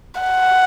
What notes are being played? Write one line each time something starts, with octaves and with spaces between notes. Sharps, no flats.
F#5